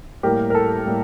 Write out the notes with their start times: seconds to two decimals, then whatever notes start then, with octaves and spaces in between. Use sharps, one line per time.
0.23 A2 G3 A#3 G4 A#4
0.50 A#4
0.55 A4
0.86 A2 G3 A#3